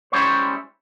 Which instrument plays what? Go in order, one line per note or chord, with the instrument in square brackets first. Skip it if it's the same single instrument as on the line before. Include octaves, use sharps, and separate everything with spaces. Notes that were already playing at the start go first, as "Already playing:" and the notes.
[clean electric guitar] G3 G#3 C#4 E4 C5 C#5